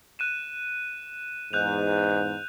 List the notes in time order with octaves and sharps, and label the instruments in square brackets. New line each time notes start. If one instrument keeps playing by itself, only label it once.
[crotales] F#6 D#7 E7
[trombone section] E2 G#2 [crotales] F#6 G6 F7